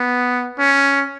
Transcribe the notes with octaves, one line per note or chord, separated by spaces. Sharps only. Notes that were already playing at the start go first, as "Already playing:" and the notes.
Already playing: B3
C#4